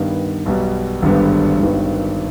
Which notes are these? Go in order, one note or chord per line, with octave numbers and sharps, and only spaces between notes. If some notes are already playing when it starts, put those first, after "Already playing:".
Already playing: G2 D#3 B3
B1 B2 G3 B3
G#1 G2 D3 G3 B3
G#1 G2 D#3 B3